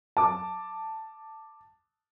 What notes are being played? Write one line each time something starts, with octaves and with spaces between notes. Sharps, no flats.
A5 D6